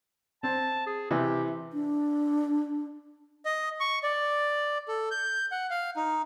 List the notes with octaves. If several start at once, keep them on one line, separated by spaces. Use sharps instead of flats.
C4 A5
G#4
C3 E3 G4
D4
D#5
C#6
D5
A4
G6
F#5
F5
D#4